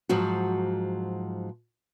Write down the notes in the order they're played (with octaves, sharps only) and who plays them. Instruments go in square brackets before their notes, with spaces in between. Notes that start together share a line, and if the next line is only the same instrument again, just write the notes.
[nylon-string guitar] G#2 F3 F#3 F#4